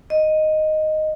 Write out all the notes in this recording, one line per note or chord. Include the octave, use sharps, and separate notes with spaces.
D#5